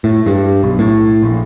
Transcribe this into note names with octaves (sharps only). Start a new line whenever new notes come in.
A2
G2
B1
A2
A#1